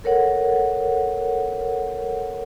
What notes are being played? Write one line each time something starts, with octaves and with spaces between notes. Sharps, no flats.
A4 A#4 C#5 F#5